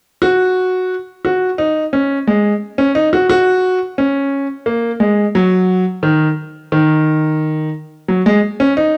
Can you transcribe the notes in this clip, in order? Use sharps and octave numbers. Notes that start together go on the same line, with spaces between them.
F#4
F#4
D#4
C#4
G#3
C#4
D#4
F#4
F#4
C#4
A#3
G#3
F#3
D#3
D#3
F#3
G#3
C#4
D#4